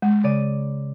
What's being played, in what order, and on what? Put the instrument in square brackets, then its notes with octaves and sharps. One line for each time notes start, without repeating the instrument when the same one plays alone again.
[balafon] G#3
[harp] C#3 D5 D#7